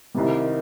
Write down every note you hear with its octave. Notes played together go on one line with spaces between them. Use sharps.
C2 C3 D#3 G3